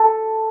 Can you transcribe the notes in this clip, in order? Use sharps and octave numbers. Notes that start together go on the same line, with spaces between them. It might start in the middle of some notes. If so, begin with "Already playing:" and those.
Already playing: A4